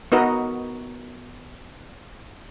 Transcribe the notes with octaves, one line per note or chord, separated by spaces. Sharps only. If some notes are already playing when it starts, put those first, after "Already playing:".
B3 D#4 F#4 A#4 B4 D#5